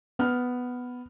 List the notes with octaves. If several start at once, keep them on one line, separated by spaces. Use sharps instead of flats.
B3 F6